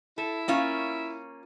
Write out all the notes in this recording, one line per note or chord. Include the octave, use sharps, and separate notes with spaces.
E4 A4
A#3 C#4 F4